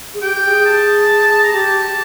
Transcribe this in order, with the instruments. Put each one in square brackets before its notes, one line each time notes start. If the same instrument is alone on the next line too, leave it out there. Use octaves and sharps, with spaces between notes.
[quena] G#4
[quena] G4 [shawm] G5
[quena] G#4
[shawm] A5
A#5
[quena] G4 [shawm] A5